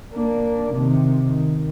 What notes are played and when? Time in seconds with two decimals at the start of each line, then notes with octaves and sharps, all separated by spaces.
0.13 A#3 D4
0.74 C3 D#3
1.23 D#3